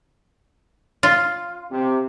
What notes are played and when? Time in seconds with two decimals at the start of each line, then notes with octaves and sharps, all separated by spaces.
1.03 F4
1.71 C3